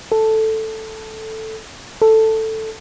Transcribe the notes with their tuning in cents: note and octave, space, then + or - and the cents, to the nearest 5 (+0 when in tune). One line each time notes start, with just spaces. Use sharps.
A4 +0
A4 +5